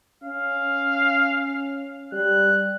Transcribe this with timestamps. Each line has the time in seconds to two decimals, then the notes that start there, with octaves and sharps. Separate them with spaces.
0.23 C#4 F5
2.12 G3 F#6